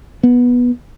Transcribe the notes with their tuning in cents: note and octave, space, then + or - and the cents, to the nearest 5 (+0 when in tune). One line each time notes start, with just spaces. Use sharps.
B3 -10